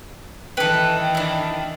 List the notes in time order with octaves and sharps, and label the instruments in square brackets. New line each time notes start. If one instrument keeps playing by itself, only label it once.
[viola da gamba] D#3 E3 [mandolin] A4 B4 [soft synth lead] G5
[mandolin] D4 E4